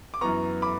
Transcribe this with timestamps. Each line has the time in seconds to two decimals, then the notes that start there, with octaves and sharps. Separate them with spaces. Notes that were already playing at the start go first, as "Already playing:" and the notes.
0.14 D6
0.21 F#2 E3 B3 A#5 C#6
0.62 B5 D6